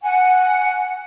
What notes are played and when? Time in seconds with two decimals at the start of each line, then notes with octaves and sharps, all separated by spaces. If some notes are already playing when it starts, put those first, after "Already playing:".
0.03 F#5 G#5